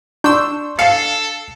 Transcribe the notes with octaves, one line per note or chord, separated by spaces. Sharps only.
D4 C6 C#6 E6 G6
A4 F5 C7 C#7